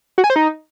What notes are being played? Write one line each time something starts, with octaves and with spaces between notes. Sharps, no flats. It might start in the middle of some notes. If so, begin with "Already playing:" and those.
F#4
G#5
C5
D#4